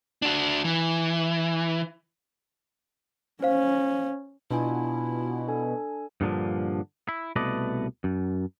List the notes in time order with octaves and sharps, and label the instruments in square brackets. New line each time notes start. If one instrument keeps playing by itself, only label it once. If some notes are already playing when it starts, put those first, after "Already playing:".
[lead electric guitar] D4 F#4
E3
[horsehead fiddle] C#4 [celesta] C5 F5
[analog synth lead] B2 [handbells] D4 F4 G#5 [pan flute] E4
[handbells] D4 A4 G#5
[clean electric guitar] G2 A#2 D3 F3
E4
C2 B2 A3 B4 D5 D#5
F#2